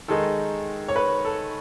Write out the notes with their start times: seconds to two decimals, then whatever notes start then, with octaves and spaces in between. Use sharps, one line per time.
0.08 D#3 G#3 D#4 A4
0.88 C#5
0.96 B4
1.25 A4